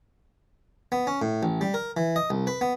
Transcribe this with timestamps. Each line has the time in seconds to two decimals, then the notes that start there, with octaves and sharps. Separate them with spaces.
0.92 B3
1.07 C#4
1.22 A2
1.43 A1
1.61 G3
1.74 A#4
1.97 E3
2.16 D#5
2.30 C2
2.47 B4
2.61 B3